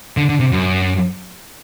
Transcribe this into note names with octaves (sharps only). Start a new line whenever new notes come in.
D3
D3
C3
F#2